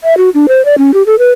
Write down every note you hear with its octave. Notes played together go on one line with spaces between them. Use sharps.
E5
F#4
D4
C5
D5
C#4
G4
A4
B4